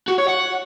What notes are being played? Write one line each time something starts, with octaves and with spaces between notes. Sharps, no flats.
F#4
C#5
F#5